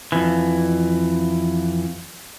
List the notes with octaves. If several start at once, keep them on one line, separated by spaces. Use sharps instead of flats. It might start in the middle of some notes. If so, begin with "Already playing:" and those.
F2 E3